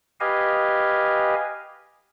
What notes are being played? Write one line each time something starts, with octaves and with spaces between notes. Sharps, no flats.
G4 B4 D#5 F5 G#5